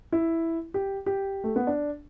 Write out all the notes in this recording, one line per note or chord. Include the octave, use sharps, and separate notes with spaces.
E4
G4
G4
A3
B3
D4